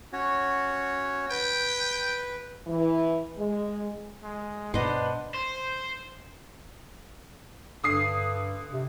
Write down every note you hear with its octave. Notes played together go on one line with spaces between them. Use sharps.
C#4 F#4 C#5
B4 G5
E3
G#3
G#3
G2 B2 B3 D4 C5 D#5
C5
G2 D3 D#6 C7
C3